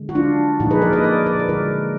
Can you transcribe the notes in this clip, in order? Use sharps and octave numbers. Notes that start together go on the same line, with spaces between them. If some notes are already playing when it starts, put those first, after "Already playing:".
Already playing: D3 G#3
F#4
D4 F4
A#2 F3 A#3 D#4 F#4
G#4 B4
A#4 D5
B4 D#5
A#4 D5
A#4 D5
B4
D3 G#3 F#4 A#4